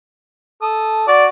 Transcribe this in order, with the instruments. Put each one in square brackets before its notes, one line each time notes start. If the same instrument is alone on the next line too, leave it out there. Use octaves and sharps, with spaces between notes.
[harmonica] A4 D#6
[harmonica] F#4 [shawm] D5